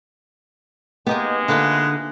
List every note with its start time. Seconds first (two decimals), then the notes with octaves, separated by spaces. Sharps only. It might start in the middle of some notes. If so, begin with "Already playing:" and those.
1.07 G#3 A#3 B3 D#4 G4
1.48 D3 A3 A#3 F4 B4